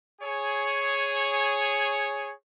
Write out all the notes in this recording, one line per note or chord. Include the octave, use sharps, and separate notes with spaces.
G#4 C#5